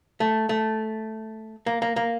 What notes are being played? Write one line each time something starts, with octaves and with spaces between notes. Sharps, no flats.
A3
A3
A#3
A#3
A#3